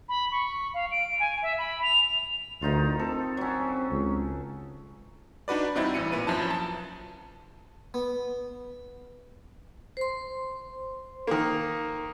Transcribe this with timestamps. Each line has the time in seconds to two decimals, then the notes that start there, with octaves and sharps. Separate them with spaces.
0.09 B5
0.32 C#6
0.74 F5
0.91 D7
1.20 G#5
1.42 E5
1.58 B5
1.83 F7
2.62 D2 D#3 D#4 F4
2.99 C4 A4
3.37 F#3 C#4
3.91 C#2
5.48 D4 D#4 F#4 B4 D5
5.75 G2 C4 D#4 E4 A6
5.94 A1 E4 C#7 D#7
6.12 A#2 B4 D#7
6.27 F#2 F3 E4 A5
6.50 A5
7.94 B3
9.97 C5 C6
11.27 D#3 A#3